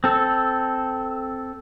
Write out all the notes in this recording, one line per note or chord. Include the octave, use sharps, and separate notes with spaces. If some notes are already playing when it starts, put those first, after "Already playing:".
C4 A4